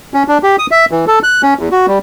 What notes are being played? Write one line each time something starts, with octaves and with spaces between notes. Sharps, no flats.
C#4
D4
G4
D#6
E5
E3
A4
F#6
C#4
E2
F#4
G3